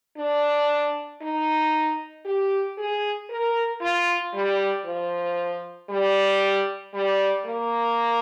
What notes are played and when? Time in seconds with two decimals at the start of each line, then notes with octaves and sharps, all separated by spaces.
0.17 D4
1.22 D#4
2.25 G4
2.78 G#4
3.30 A#4
3.81 F4
4.34 G3
4.85 F3
5.89 G3
6.94 G3
7.46 A#3